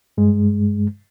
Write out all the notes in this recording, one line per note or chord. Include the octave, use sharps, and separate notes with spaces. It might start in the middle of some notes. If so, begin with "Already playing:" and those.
G2 G#3